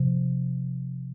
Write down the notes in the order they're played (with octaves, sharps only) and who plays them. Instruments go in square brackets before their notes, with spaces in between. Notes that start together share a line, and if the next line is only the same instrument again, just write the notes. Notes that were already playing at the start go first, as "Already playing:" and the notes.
Already playing: [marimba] C3 F3